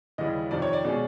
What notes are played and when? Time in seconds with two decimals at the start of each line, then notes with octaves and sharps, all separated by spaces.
0.18 D#2 C#3 E3 G3 D#5
0.51 F2 C3 D#3 D5
0.62 C#5
0.73 D5
0.84 B2 G#3 C#4